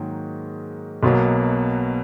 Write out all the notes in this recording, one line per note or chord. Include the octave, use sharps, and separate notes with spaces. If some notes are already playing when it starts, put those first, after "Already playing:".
Already playing: G#2 D#3 F#3 A#3
B1 B2 F#3 A#3